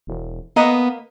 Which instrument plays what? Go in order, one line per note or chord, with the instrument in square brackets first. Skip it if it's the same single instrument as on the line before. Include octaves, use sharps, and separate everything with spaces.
[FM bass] E1
[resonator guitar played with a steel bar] A#3 D#5 [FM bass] B3